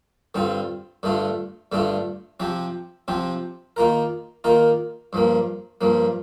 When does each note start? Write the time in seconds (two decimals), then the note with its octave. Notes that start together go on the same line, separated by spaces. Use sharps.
0.35 G2 D3 G3 C4 F4
1.03 G2 D3 A3 D4 F4
1.72 G2 D3 A3 D4 F4
2.40 C3 F3 C4 G4
3.08 C3 F3 C4 G4
3.76 D#3 A#3 F4 A#4
4.44 D#3 A#3 F4 A#4
5.13 G2 F3 A#3
5.81 G2 F3 A#3